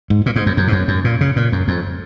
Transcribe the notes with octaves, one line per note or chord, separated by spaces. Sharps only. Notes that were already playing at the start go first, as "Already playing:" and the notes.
G#2
A#2
G#2
F#2
F#2
G#2
F#2
F#2
A#2
C#3
A#2
F#2
F2